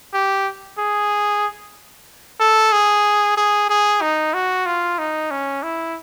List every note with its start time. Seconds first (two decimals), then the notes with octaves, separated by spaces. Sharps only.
0.14 G4
0.79 G#4
2.40 A4
2.72 G#4
3.37 G#4
3.69 G#4
4.01 D#4
4.34 F#4
4.66 F4
4.99 D#4
5.31 C#4
5.63 E4